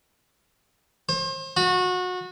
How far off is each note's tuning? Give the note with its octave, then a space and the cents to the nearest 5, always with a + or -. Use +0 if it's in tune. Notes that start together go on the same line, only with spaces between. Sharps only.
C5 +35
F#4 -25